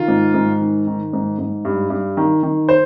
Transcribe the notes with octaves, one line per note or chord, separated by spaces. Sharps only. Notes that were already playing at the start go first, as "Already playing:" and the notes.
Already playing: D#3 F4
G#2
G#2
D#3
D#3
G#2
G#2
G2
G2
D#3
D#3
C5